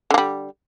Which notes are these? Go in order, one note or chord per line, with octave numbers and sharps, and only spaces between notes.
D3 G3 A#3